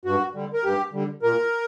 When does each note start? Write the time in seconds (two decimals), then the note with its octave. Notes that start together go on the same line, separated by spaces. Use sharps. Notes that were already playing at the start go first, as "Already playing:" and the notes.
0.05 G2 F#4
0.35 D3 G3
0.53 A#4
0.64 G2 G4
0.93 D3 G3
1.22 A#2 A#4